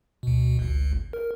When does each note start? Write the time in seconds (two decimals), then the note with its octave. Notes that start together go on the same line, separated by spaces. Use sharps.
0.23 D2 B2
0.59 G1 C#2
1.13 A#4